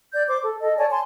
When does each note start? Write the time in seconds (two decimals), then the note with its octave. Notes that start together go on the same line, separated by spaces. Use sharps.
0.13 D5 G6
0.29 C5 D6
0.43 A4
0.61 A4 D#5
0.77 C#5 D5 G#5 A5
0.90 G#5 A5 C6